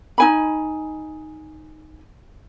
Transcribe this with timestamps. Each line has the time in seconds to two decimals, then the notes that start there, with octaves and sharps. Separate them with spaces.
0.18 D#4 G#5 B5